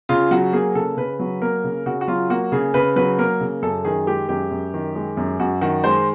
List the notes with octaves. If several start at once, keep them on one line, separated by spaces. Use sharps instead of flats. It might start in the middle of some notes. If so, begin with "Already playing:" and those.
C#3 F4
F#3 F#4
A#3 G#4
C#3 A4
C#3 B4
F#3
A#3 A#4
C#3
C#3 F#4
F#4
F#3 F4
A#3 F#4
C#3 G#4
C#3 B4
F#3 B4
A#3 A#4
C#3
F#2 A4
D#3 G#4
G#3 G4
F#2 G4
F#2
D#3
G#3
F#2
F#2 F#4
D#3 F#4
G#3 C5